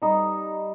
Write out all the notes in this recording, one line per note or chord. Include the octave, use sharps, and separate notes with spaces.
G3 D#4